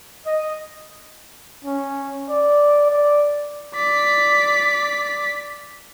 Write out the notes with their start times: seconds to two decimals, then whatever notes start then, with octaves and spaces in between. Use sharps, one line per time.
0.25 D#5
1.65 C#4
2.30 D5
2.90 D5
3.75 D5 B6